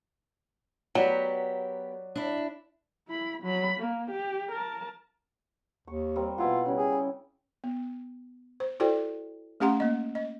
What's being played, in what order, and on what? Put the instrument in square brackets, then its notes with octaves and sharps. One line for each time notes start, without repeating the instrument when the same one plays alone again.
[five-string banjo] F#3 [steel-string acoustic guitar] B3 G4 A#4 [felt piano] F#4 D5
[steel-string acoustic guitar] D4 E4
[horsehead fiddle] E4 B5
F#3 B5
A#3
G4
A#4 A5
[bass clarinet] D#2 [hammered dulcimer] C#6
[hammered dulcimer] G3 A#3 C4
[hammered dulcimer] B2 E4 F#5 [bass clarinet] F4
[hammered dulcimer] C#3 G3 C#4
[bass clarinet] G#4
[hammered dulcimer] G5
[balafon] B3
C5
E4 F#4 A4 C5 D5 G5
A3 C#4 G4 F#5 A#5 C6
A#3 D#5
D#5